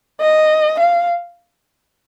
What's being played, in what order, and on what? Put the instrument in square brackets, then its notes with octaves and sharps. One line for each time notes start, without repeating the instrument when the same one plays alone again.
[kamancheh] D#5
F5